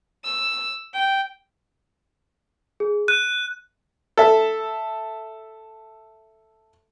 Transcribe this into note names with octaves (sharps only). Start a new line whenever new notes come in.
E6
G5
G#4
F#6 D#7
A4 E5